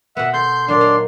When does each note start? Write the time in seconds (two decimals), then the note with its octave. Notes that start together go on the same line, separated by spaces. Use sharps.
0.17 B2 B3 E5 F#5
0.34 A4 C6 G6
0.68 A#2 F#3 A#3 D4 C6
0.81 A#3 D#4 C5